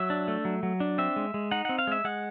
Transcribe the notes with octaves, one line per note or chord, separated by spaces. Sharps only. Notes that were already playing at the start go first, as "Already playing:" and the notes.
Already playing: F#3 E5
D4
A3
F#3
F#3
D4
C4 E5
G#3
G#3
D#4 F#5
C4 F#5
F5
G#3 E5
G#3 F#5